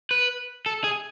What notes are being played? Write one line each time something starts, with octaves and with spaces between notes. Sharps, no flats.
B4
A4
G#4